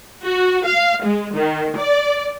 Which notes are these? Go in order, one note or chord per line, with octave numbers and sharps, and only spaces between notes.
F#4
F5
G#3
D#3
D5